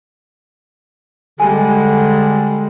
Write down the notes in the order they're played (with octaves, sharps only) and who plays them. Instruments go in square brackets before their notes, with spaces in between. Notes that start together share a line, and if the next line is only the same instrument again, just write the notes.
[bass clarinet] D3 [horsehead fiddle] G3 G#3 [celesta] G#5